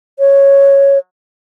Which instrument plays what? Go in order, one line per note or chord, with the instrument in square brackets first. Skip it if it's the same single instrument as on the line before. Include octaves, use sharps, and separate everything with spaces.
[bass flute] C#5